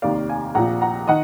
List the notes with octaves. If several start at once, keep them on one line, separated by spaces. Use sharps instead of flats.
F1 D#2 D#3 D5 F5
F5 G#5
A#1 A#2 F3 F#5 A#5
F#5 A#5
D#3 D#5 F#5